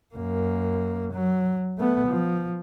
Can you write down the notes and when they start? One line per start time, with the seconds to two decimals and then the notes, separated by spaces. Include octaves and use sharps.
0.15 F#2 A#3
1.13 F#3
1.78 A3 B3
2.08 F3